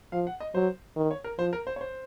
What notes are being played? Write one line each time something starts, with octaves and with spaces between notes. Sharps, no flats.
F3 F5
F#5
D#5
F#3 C5
D#3
C#5
A#4
F3 C5
A#4
C5
C#5
C5